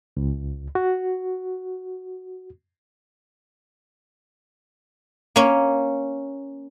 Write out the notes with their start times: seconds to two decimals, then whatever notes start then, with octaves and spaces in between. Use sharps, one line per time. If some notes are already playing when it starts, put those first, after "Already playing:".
0.17 C#2
0.75 F#4
5.36 A#3 C#4